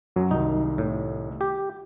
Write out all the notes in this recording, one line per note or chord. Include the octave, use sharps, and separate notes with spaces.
F#2 F#3
C2 D#3 D#4
A2
G4